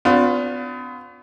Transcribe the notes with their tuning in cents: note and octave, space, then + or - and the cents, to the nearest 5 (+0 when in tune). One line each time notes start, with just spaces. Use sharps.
B3 +40 D4 -30 F4 +35